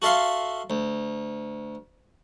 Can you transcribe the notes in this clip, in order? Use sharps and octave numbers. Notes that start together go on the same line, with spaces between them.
F#4 A4 E5 F5 C6
D2